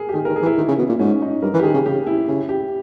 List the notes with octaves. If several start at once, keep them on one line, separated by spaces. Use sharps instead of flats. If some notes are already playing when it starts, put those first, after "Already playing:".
Already playing: G#4 A#4
G4
D#3 G#4
A#4
D#3
G#4
E3
E4
D#3
C#3
B2
A#2
G#2 C#4
D#4
G2 A#4
E3
G4
D#3 G#4
C#3
C#3 G4
E4
C#3 E4
G4